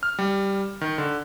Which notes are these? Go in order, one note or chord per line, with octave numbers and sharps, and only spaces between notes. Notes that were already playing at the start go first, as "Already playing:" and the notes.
F6
G3
D#3
D3